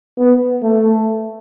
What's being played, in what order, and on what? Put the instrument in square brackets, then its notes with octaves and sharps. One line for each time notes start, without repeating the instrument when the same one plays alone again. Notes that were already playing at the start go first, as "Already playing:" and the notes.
[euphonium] B3
A3